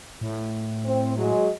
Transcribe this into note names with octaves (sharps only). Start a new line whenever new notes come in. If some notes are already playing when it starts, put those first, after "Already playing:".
A2
C4
F#3 G#3